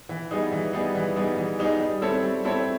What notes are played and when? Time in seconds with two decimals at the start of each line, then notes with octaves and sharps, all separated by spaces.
0.09 E3
0.31 G3 B3 D#4 G#4
0.52 E3
0.73 G3 B3 D#4 G#4
0.95 E3
1.16 G3 B3 D#4 G#4
1.37 E3
1.59 G3 B3 D#4 G#4
1.81 G3
2.02 C4 E4 A4 C#5
2.23 G3
2.45 C4 E4 A4 C#5